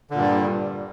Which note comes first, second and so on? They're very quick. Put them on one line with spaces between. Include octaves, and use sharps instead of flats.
D3 A#2 G2 G3